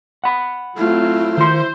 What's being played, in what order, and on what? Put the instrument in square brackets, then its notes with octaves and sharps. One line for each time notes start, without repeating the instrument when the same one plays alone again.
[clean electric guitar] F#5 B5
[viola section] F#3 C4 [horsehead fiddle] A3 F4 [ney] E4
[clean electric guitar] D#3 C6 [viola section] C5